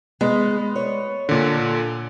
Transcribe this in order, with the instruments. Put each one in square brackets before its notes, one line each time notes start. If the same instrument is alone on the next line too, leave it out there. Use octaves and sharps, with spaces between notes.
[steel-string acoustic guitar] G#3 [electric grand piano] B3
[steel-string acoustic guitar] C#5
[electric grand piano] A#2 D3